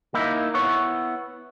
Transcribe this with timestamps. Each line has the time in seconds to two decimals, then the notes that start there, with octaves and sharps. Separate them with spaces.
0.14 A#3 D#4 E4
0.54 B3 E4 C#5